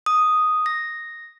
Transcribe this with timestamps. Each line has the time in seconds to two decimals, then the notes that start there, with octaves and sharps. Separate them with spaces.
0.06 D#6
0.66 A#6